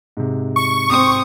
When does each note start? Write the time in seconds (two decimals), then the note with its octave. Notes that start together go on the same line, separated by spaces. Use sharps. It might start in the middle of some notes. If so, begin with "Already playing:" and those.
0.17 G#2 C3
0.56 C#6
0.90 C4 D#6